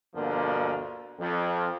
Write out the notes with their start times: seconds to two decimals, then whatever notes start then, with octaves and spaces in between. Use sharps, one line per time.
0.15 D2 G2 B2 D3 F3 A#3
1.19 F2